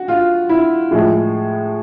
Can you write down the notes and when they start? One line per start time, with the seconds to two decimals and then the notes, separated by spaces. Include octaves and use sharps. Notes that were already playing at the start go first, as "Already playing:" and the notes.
Already playing: F#4
0.08 F4
0.49 E4
0.91 A2 F3 G#3